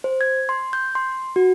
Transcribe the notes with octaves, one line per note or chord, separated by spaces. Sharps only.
C5
G#6
C6
G6
C6
F#4